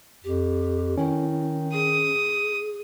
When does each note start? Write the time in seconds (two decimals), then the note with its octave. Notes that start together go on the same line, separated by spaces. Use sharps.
0.24 F2 G4
0.97 D#3 C#4 E4
1.73 G#4 D#6